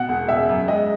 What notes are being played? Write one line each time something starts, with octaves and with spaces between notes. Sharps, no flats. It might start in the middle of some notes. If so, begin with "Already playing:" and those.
Already playing: B2 F#5
E1
C#3 E5
F#2
G#3 D#5